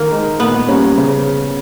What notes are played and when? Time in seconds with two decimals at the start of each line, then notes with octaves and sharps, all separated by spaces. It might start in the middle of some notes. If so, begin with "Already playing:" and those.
Already playing: D#3 A#3
0.11 G#3 D#4
0.40 A#2 B3
0.68 G3 A#3 C#4
0.98 C#3